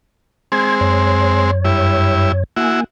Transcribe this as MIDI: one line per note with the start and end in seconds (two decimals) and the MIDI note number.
0.52 1.51 56
0.52 1.51 60
0.52 0.76 92
0.81 2.44 42
0.81 2.44 73
1.65 2.32 43
1.65 2.32 64
2.56 2.84 58
2.56 2.80 64
2.56 2.80 66
2.56 2.84 80